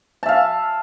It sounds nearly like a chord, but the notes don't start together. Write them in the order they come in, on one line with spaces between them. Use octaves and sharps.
A5 E5 F5